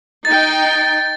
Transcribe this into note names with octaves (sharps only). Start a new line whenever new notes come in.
D#4 G5 A6